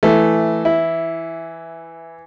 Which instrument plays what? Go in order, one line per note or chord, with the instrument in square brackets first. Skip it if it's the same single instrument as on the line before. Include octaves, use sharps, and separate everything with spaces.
[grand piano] E3 [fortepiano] A3
[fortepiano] E4